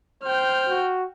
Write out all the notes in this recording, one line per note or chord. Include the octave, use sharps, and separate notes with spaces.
C5 G5 F6
F#4